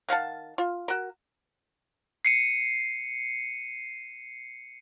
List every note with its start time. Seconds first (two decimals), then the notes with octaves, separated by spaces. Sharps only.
0.09 D#3 F5 F#5 A5
0.58 F4
0.88 F#4 A#4
2.25 C7 C#7 D#7